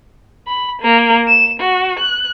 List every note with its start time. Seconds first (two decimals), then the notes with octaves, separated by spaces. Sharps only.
0.47 B5
0.82 A#3
1.27 E7
1.60 F#4
1.99 F#6